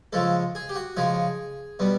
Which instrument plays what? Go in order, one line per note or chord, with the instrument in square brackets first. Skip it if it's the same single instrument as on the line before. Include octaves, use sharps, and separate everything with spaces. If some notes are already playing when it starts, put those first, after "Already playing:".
[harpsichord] C#3 F3 G#3 A4
G#4
G4
F#4
C#3 F3 G#3 G#4
B2 G3 B3